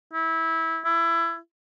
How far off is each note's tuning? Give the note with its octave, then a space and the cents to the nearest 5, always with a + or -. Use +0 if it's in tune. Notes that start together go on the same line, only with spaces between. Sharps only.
E4 -20
E4 +25